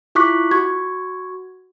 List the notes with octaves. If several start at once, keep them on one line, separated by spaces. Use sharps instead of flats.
E4 F4 C#6 D6 F#6 B6
F#4 C#6 G#6